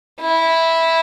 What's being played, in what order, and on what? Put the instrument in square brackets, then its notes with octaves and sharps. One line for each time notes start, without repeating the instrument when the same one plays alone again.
[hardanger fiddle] E4